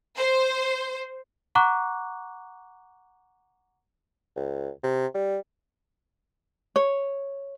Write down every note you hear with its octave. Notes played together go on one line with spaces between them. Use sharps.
C5
F#5 A#5 C#6 D6 F#6
C#2
C3
G3
C#5